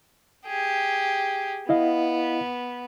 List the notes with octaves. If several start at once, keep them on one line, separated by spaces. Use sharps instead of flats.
G4 G#4
B3 E4 D#5 F5